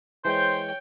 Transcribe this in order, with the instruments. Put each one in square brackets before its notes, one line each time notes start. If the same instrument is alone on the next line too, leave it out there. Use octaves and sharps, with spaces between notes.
[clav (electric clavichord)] E3 G#3 [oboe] C5 [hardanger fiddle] C#5 G5